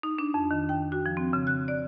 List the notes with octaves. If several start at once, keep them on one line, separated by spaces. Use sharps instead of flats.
D#4
D4
F2
D#3
G5
F#4
F3
C4
C#3
F#6
D5